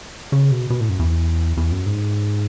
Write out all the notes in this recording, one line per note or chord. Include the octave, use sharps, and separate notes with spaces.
C#3
B2
B2
A2
F#2
E2
E2
F#2
G#2